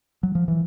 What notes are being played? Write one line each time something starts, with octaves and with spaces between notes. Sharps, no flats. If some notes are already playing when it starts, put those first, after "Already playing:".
F#3
F3
E3